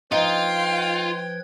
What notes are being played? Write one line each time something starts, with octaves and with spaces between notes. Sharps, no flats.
F3 D#4 F4 B4 G5 G#6